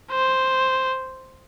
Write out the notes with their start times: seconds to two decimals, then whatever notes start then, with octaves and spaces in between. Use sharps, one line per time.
0.11 C5